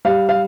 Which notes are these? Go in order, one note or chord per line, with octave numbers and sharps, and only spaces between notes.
G3 F5
F5